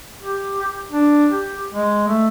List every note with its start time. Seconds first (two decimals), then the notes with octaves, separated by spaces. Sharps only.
0.23 G4
0.91 D4
1.32 G4
1.73 G#3
2.08 A3